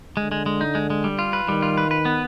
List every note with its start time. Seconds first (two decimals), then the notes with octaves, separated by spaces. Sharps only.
0.17 D3 G#3
0.32 G#3
0.46 G#3
0.61 D#4
0.75 G#3
0.90 G#3
1.04 G3
1.19 F4
1.33 B4
1.48 D#3 G3
1.62 F4
1.77 B4
1.91 B4
2.05 B3